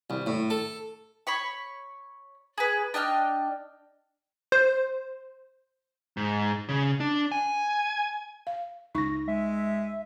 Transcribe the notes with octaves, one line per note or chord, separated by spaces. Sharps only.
C2
A2
A4
C#5 B5 C#6
G#4 B4
D4 D#5 G5 F6
C5
G#2
C#3
D4
G#5
F5
C#2 D#4 C#6 A#6
G#3 E5